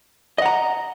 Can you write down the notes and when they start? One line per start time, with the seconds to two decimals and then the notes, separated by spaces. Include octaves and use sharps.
0.38 D#5
0.42 F#5
0.46 A#5